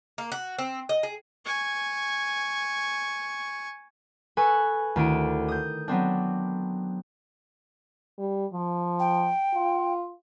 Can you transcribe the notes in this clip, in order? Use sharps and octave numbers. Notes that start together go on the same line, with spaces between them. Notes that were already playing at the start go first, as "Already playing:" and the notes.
A#3
F#4
C4
D#5
G#4
G#5 C#6
A4 B4 G#5 C#6
D2 D#3 D4 E4 D7 D#7
D#6 G6
F#3 B3 C4 D4
G3
F3
G5
F4